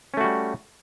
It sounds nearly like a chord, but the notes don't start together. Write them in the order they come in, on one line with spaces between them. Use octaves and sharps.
C#4 A3 F#4 G3